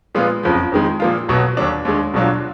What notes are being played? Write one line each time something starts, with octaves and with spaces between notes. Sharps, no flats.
A#2 F3 G#3 B3 F4
F#1 F2 F3
F2 D#3 G#3
A#2 F3 A#3 F4
B1 B2 F#3 B3
D#2 D3 F#3 D4
D#2 D3 G#3
B1 B2 F#3 D4 F4